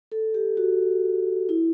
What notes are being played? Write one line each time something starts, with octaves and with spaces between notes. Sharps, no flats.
A4
G4
F#4
E4